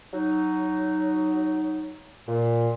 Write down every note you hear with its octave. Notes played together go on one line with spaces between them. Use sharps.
F#3 D#4
A#2